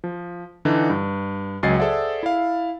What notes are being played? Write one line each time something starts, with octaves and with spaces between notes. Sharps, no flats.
F3
D3 E3 D4 D#4
G2
C#2 F#3 D#5 G#5 A6 C7
G#4 A4 C5 D5 E5 F#5
E4 F5